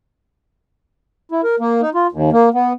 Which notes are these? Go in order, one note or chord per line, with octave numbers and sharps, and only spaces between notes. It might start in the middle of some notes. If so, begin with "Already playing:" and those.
E4
A#4
A#3
D#4
F4
D#2
A#3
B3